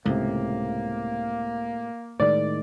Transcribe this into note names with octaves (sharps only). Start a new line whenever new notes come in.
C#2 A2 C3 A#3
A2 D#3 G#3 D5